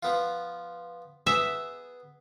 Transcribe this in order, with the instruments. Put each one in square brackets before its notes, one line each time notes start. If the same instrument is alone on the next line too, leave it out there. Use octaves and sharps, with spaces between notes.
[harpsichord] F3 B3 F4
[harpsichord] B3 G#4 [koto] E5